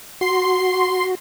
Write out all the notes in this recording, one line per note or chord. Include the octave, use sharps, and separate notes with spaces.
F#4 C6 C7